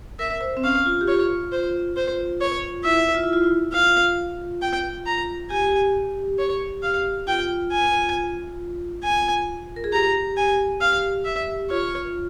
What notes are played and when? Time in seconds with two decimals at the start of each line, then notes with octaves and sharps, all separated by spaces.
0.19 A#4 E5
0.41 C5
0.57 C4
0.64 C#4 F5
0.86 F4
1.01 G4
1.08 F4 C#5
1.52 C5
1.96 C5
2.41 C#5
2.84 E4 E5
3.15 F4
3.24 E4
3.33 F4
3.44 E4
3.73 F4 F5
4.62 G5
5.06 A#5
5.50 G4 G#5
6.38 C#5
6.83 F5
7.27 F4 G5
7.72 G#5
9.04 G#5
9.76 A#4
9.84 G#4
9.93 G4 A#5
10.37 G#5
10.81 F5
11.25 E5
11.70 F4 C#5